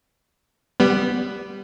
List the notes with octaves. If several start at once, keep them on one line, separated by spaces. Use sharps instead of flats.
G3 B3